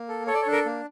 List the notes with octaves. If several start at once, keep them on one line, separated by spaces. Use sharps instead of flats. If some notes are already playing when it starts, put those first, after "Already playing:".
Already playing: A#3
A4
A4 C#5
D5
C#5
D4
A#4
A#3